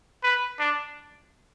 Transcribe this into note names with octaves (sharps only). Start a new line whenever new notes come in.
B4
D4